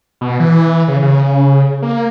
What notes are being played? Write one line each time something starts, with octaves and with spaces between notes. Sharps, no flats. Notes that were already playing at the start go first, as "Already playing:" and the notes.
B2
E3
C#3
C#3
A#3